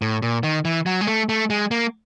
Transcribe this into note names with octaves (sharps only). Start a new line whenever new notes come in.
A2
A#2
D#3
E3
F#3
G#3
A3
A3
G#3
A#3